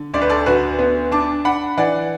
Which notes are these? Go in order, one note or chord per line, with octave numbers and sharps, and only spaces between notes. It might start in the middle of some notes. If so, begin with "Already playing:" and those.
Already playing: D3
D2 D5
B4
A4 D5
D2 F#4 B4
B3
D4 A5 D6
D4 F#5 B5
E3 D5 F#5